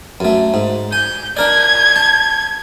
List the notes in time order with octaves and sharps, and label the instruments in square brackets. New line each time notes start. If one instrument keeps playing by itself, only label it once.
[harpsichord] F#2 A3
G#2
[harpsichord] G#5 [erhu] G6
[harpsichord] D4 A#4 D5 [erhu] G#6
[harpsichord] A5